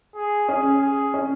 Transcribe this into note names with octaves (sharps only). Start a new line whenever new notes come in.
G#4
C#4 G#4
G#4
C#4